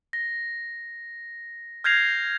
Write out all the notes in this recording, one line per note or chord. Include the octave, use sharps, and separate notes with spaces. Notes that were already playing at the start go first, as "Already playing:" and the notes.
A#6
F6 G6 G#6 A#6 C7 F7